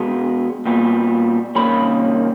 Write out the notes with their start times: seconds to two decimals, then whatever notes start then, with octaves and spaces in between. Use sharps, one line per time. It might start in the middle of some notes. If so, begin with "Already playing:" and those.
Already playing: B2 G#3 B3
0.66 A#2 G3 B3
1.55 C3 D#3 G3 A#3 C#4 B5